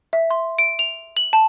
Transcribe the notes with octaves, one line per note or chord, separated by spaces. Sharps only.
E5
C6
D7
F7
F#7
A5